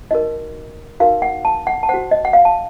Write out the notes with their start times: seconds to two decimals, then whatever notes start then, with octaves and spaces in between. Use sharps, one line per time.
0.11 D#4 F#4 A#4 D#5
1.00 D#4 F#4 A#4 F5
1.22 F#5
1.45 A5
1.67 F#5
1.83 A5
1.89 F#4 C5 F#5
2.11 D#5
2.25 F#5
2.33 F5
2.45 A5